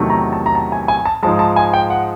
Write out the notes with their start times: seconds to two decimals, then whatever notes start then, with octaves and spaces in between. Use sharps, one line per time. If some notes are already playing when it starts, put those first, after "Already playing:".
Already playing: E2 C3 D#3 F#3 A3
0.10 A#5
0.33 A5
0.46 A#5
0.55 A5
0.72 G#5
0.88 G#5
1.05 A5
1.23 G#2 F3 G#3 A5
1.39 A5
1.56 G#5
1.73 G5
1.90 F#5